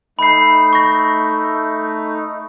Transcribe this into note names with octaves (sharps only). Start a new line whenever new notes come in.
A3 D#4 B5 C7
C#6 A#6